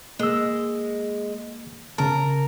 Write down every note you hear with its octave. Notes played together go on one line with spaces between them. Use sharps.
G#3 A#3 E6
C#3 A#4 A5